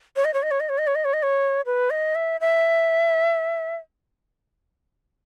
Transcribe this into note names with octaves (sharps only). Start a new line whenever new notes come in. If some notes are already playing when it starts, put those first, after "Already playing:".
C#5
D#5
C#5
D#5
C#5
D#5
C#5
D#5
C#5
D#5
C#5
D#5
C#5
B4
D#5
E5
E5